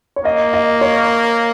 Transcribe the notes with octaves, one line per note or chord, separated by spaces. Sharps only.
C#5
A#3 D#5
D#5
C#5